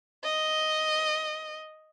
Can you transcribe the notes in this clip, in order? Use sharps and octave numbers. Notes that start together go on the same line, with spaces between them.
D#5